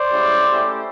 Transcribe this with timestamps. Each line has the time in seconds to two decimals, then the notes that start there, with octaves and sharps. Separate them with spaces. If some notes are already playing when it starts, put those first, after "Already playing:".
Already playing: C5 D5
0.11 G#3 C#4 E4 G4
0.47 A3 C#4 E4 G4